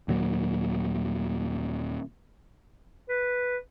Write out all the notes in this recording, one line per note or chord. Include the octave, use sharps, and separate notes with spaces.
D#2 A#2 F#3
B4